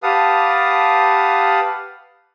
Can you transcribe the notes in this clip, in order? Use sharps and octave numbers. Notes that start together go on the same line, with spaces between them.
G4 B4 F5 F#5 A5 D#6